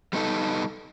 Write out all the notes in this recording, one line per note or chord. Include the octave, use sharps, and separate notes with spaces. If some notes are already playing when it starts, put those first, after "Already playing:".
G3 B3 D#4 A4